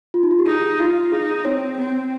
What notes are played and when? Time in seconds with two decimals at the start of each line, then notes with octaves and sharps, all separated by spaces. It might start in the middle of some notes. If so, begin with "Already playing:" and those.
0.14 F4
0.23 D#4
0.31 F4
0.39 G4
0.47 D#4 G#4
0.79 F4
1.12 D#4 G#4
1.45 C4 C#5
1.78 C4